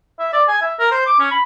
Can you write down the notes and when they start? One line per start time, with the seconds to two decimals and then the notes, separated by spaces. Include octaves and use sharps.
0.19 E5
0.33 D5
0.48 G#5
0.62 E5
0.79 A#4
0.91 C5
1.06 D6
1.19 C#4
1.31 B5